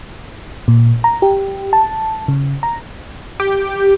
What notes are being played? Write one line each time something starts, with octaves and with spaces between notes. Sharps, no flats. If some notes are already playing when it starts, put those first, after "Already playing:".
A#2
A#5
G4
A5
C#3
A#5
G4